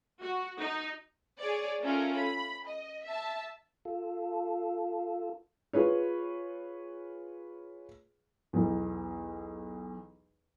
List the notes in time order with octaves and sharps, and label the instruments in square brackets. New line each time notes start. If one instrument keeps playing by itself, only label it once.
[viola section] F#4
D#4
[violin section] G#4 C#5 D5
A3 C#4 F4 A4 A#4
B5
D#5
E5 A5
[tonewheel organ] F4 A4
[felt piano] F4 G#4 B4 C#5
[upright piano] B1 E2